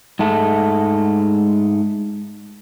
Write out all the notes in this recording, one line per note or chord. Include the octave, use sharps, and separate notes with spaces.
G#2 G#3 A3